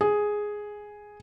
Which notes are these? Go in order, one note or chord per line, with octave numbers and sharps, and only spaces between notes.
G#4